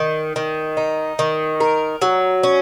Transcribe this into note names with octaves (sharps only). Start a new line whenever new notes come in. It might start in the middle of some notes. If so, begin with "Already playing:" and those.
Already playing: D#3
D#3
D#4
D#3
A#4
F#3
C#4